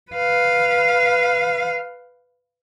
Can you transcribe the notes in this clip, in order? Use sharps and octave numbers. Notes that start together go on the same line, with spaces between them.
B4 F5